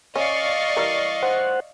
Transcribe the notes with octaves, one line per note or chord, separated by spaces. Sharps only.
C#4 D5 D#5 F5 C#6
E3 G3 A#4
C5 F#5